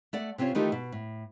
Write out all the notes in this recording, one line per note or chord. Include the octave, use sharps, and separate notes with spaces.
A3 D5 F#5
C3 C4 C#4 F4 C#5
D#3 E3 A3 D#4 F4 G4
B2
A2